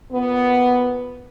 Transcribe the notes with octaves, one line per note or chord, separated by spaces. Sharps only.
A#2 B3